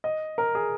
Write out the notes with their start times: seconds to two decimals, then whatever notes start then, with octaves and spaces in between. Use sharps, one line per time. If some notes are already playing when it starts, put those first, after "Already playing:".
0.04 D#5
0.38 A#4
0.55 G#4